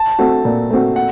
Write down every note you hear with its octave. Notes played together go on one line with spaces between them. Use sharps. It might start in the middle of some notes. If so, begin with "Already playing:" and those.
Already playing: A5
A3 C4 F#4
A#2
A3 C4 F#4
F#5